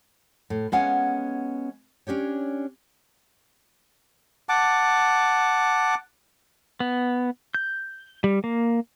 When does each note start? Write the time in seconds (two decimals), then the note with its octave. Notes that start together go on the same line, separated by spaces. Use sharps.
0.50 A2
0.72 G#3 B3 C#4 F5 F#5 G#5
2.07 C#4 D4 G4 C#5
4.49 F#5 A5 D6
6.80 B3
7.55 G6
8.24 G3
8.44 A#3